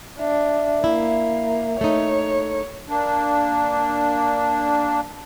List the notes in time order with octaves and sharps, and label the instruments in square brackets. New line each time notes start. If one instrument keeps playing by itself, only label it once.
[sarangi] D4 [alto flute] E5
[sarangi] A#3 [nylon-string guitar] E4
[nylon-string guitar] A3 D#4 [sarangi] C#5
[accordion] A#3 D4